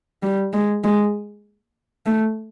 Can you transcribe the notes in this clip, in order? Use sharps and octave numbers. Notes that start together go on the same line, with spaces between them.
G3
G#3
G#3
A3